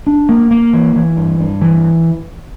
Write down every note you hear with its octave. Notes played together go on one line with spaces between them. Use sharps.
D4
A#3
A#3
E3
E3
G2
G2
E3